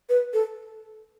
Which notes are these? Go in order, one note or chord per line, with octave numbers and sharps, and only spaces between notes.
B4
A4